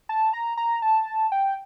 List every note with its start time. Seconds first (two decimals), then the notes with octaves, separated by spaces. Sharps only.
0.09 A5
0.33 A#5
0.57 A#5
0.82 A5
1.32 G5